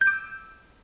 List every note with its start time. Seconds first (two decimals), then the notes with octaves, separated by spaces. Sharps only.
0.01 G6
0.07 D6
0.13 E6